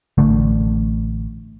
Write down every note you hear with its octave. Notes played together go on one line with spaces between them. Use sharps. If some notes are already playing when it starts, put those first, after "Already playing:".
A1 D3 A3